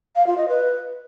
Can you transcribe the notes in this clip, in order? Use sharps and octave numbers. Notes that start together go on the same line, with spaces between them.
F5
F4
D#5
B4